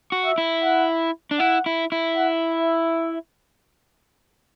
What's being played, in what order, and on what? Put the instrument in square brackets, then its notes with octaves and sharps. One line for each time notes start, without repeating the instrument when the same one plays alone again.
[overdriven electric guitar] F#4
[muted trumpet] E5
[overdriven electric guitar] E4
[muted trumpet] F#5
[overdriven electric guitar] D4
[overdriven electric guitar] E4 [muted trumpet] F#5
[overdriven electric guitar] E4
E4
[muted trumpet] F#5
E5